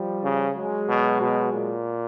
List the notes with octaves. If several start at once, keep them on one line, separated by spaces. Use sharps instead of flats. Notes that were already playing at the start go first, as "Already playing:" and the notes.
Already playing: F3 G3
C#3
F#3 G#3
B2
B2
A#2